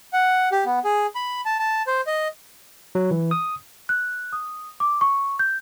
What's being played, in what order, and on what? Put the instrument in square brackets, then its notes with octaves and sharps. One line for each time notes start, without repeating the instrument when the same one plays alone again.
[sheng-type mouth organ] F#5
G4
B3
G#4
B5
A5
A5
C5
D#5
[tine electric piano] F#3
E3
D#6
[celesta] F#6
D#6
D6
C#6
G6